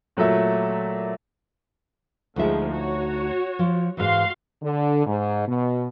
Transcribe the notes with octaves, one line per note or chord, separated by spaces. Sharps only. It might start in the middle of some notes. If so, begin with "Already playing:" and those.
A#2 F#3 A3 E5
D2 F3 G#3 D#4 E5
F#4 C#5
F3
G#2 E3 F#4 F5 C6
D3
G#2
B2